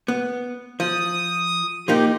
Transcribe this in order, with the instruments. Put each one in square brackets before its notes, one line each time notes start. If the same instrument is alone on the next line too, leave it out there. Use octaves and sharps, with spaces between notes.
[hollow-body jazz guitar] B3
[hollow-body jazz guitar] F3 [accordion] D#6
[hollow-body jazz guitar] F3 A#3 D#4 [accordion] G4